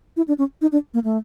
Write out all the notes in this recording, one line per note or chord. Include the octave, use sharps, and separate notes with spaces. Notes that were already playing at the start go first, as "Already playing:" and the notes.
E4
D4
C#4
D#4
D4
A#3
A3